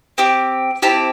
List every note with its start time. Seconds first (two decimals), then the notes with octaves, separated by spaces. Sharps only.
0.18 C4 G4
0.82 C4 E4 G4 A5